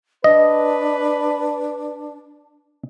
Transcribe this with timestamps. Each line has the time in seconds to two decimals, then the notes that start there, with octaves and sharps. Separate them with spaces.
0.24 D4 B4 D#5